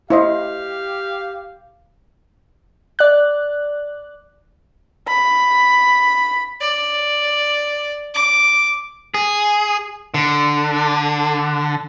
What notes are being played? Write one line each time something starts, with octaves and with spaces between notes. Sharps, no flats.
E4 G4 C5 D#5 F5
D5 F#6
B5
D5
D6
G#4
D3